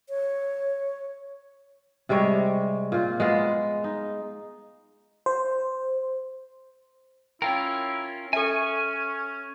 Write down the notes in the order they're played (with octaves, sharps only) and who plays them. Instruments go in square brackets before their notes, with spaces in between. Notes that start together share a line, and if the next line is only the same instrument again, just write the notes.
[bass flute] C#5
[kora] C3 G3 G#3 C#5
A#2 F4
G#3 B3 F4
D#4
[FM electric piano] C5
[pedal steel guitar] C#4 F4 A#4 [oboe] E4 [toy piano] G5 A#5
[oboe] C#4 [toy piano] A4 E5 [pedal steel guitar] G#5 C#6